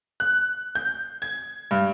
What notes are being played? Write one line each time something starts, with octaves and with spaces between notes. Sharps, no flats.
F#6
G6
G#6
G2